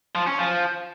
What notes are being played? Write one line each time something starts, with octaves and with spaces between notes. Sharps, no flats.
F3
C#4
F3